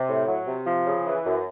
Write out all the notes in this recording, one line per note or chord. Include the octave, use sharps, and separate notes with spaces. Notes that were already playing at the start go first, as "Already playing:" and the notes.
Already playing: C3
A2
F#3
C3
F3
C#3
E3
F#2